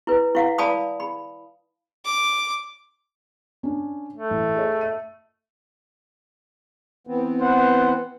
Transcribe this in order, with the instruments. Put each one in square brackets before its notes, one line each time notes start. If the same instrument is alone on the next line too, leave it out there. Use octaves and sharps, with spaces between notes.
[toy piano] E4 B4
E4 F5 F#5
D5 F5 G#5 A5 B5 D#6
B5
[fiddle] D6
[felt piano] C#4 D4
[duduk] A3
[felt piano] A1
G#4 C#5
E5 D#7
[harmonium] E3 B3 C4
[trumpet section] B4 C5 F#5